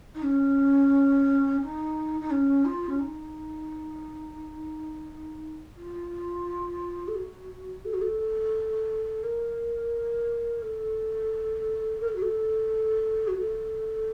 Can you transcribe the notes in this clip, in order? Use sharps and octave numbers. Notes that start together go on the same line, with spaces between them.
D#4
C#4
D#4
D#4
C#4
F4
C#4
D#4
F4
A4
F#4
A4
F#4
A4
A#4
A4
A#4
A4
F#4
A4
F#4
A4